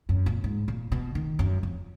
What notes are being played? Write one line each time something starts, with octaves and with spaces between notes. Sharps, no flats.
F#2
A#2
G#2
A#2
B2
D#3
F#2
F2